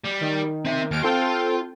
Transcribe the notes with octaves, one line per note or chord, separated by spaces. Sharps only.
G3
D#3
C4 E5
D#2 F6 D7
C4 F4 A4 G5